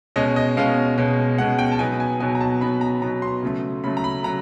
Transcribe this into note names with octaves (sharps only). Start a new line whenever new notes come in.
B2 G#3 C#4 D#5
D#5
B2 G#3 C#4 F5
B2 G#3 C#4
B2 G#3 C#4 F#5
G5
A5
B2 F#3 B3 D#4 G#5
G#5
B2 F#3 B3 D#4 G#5
A#5
A5
B2 F#3 B3 D#4 B5
A#5
B2 F#3 B3 D#4 A#5
C6
C#3 F#3 A3
C#3 F#3 A3 B5
A#5
B5
C#3 F#3 A#5